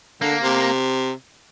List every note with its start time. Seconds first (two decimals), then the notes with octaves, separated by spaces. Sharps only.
0.22 D3 A#3
0.43 C3